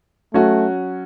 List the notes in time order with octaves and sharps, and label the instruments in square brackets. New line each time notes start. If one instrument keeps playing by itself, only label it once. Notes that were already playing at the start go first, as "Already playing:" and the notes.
[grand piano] F#3 C#4 F#4 [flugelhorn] A3